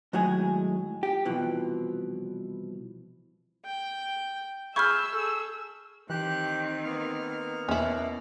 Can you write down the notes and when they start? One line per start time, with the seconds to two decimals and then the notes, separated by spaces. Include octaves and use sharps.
0.13 D#2 A2 F#3 G#3 G#4
1.03 G4
1.25 C2 B2 E3 F3
3.65 G5
4.76 G#4 B5 C#6 E6 F6 G6 G#6
5.11 G#4 A4
6.10 D#3 E3 C4 G4 F#6
6.84 A#3 B3 F6
7.69 E2 B2 C#4 E4